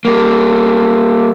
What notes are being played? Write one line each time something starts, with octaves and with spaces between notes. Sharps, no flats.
G3 A#3